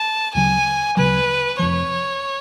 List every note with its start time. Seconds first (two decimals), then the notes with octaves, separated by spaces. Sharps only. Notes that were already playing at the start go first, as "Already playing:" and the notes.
Already playing: A5
0.35 D2 C#3 F#3 G#5
0.97 D2 C#3 F#3 B4
1.59 F1 F2 F3 C#5